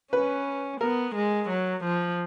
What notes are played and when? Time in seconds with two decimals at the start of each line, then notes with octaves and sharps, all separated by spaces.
0.13 C#4 B4
0.80 B3 A#4
1.15 G#3
1.49 F#3
1.84 F3